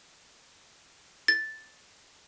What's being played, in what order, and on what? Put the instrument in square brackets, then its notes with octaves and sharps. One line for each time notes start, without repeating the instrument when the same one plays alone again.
[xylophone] A6